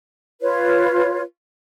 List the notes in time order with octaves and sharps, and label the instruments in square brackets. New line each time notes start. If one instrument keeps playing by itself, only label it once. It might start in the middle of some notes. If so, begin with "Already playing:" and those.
[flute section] F4 B4 C#5